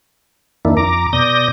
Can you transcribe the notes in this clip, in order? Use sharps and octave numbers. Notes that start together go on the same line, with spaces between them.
F2 D#3 A#3 D4 E4
F2 A#5 D6
B2 D5 D#6 G6 A#6